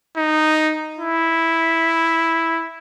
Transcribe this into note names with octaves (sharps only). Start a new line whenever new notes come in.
D#4
E4